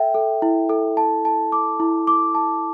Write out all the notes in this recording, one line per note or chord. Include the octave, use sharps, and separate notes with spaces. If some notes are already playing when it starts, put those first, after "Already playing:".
Already playing: A4 E5 G5
A4
E4
A4
A5
A5
D6
E4
D6
A5